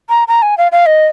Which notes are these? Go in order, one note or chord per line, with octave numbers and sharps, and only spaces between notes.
A#5
A#5
G#5
F5
F5
D#5